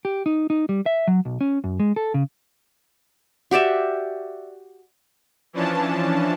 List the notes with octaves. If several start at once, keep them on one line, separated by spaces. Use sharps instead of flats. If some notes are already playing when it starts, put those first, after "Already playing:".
G4
D#4
D#4
G3
E5
F#3
B1
C#4
F#2
G#3
A4
C#3
F#4 G4 D5 E5
E3 F3 C#4 D4 A5